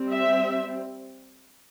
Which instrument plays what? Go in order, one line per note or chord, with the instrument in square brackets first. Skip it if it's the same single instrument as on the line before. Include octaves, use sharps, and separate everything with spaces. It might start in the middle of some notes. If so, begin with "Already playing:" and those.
Already playing: [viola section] G3 C4
E5